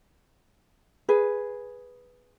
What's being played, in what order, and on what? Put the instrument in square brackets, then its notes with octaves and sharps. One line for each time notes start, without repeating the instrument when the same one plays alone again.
[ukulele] G#4 B4